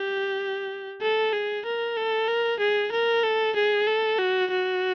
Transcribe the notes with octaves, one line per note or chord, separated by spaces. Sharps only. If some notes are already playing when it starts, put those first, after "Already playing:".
Already playing: G4
A4
G#4
A#4
A4
A#4
G#4
A#4
A4
G#4
A4
F#4
F#4